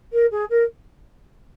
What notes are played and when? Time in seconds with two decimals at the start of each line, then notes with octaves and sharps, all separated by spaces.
0.12 A#4
0.31 G#4
0.50 A#4